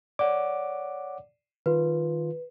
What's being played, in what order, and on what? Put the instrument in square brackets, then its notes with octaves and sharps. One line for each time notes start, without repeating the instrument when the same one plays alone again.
[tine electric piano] C#5 F#5 D6 [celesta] D5
[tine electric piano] D#3 F4 [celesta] B4